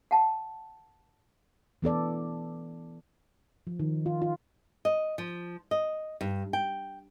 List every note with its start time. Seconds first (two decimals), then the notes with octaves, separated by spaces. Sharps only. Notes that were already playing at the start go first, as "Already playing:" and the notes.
0.11 F#5 A5
1.82 E3 B3 A4 D5
3.67 F3
3.80 D#3
4.06 F4
4.22 F4
4.85 D#5
5.18 F3
5.71 D#5
6.21 G2
6.53 G5